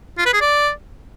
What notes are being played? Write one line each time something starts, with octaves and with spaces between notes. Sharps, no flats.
F4
B4
G#4
D5